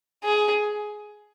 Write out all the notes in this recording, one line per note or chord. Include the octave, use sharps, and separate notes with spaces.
G#4